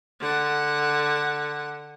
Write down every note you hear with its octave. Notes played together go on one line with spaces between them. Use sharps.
D3 F#5